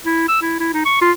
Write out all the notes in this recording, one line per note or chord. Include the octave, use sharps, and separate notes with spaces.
E4
E6
E4
E4
D#4
C#6
F4